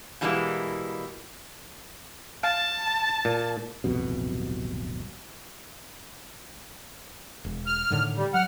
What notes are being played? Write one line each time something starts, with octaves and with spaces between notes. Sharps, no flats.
B2 E3 G3 G#3 A#3 E4
F5 A5
A#2
D1 C2 F2 B2
E1
F6
A2 D3 D#3
G3
F#3 F#5 F6